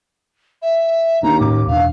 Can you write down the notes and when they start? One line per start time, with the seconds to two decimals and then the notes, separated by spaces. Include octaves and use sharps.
0.62 E5
1.23 D#2 D4 A#5
1.41 A2 A#3 C#4 D6
1.67 E1 D4 F5